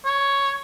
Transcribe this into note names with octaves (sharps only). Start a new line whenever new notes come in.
C#5